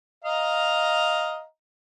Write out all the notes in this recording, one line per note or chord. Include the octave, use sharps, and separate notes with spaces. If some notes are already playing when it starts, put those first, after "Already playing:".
D#5 F5 A#5